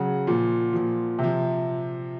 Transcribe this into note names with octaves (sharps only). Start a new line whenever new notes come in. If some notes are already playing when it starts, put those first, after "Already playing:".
Already playing: C#3 F#3 F#5
A#2 F3
A#2 F3
C3 F3